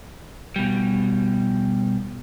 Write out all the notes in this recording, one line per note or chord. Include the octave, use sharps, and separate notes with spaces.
B2 G3